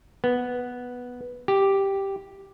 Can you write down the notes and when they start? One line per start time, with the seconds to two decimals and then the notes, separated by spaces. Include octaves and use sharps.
0.24 B3
1.48 G4